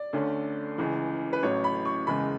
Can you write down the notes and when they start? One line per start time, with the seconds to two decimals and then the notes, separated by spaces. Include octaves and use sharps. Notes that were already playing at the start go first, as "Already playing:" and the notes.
Already playing: D5
0.13 D2 D3 A3 C#4
0.78 C#2 C#3 E3
1.33 B4
1.43 A1 A2 F#3 C#5
1.64 B5
1.85 C#6
2.07 F#1 E2 C#3 G#3 B5